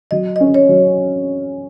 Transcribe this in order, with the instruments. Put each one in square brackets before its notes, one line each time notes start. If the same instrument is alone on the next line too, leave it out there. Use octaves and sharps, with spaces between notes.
[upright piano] F#3 [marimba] D#5
[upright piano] C#4 [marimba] D#5
[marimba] C#5
[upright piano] F#3